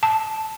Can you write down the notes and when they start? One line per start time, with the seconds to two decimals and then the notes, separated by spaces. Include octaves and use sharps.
0.03 A5